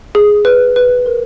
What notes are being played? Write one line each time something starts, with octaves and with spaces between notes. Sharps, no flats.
G#4
B4
B4
A#4